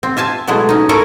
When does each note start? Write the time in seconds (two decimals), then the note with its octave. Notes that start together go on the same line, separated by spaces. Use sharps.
0.03 C4
0.17 F4 E5 G#5 A5
0.47 B2 F#3 G#3 A3 E4
0.69 C#4 D#4
0.89 E4 A4 A#4 C#5 G#5 A#5